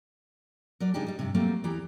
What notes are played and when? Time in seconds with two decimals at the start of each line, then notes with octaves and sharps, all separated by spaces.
0.80 F#3 A#4 D5
0.94 C#3 G#3 D4 D#4 G4
1.07 G3 D#4
1.19 G2 C3
1.34 F#3 G3 A3 A#3 C4
1.64 E2 E3 G4 A#5